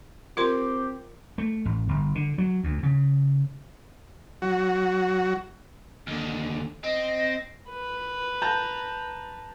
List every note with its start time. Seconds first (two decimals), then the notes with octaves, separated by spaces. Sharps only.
0.37 C4 F4 G4 A#4 C6
1.38 A3
1.65 A1
1.89 G1
2.15 D3
2.38 F#3
2.64 D2
2.83 C#3
4.42 F#3 F#4
6.07 D#2 D3
6.84 C4 D#5
7.69 B4
8.42 A5 A#5 G6